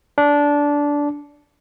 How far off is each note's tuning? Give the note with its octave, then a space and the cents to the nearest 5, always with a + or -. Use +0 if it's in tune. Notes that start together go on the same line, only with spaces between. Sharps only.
D4 -15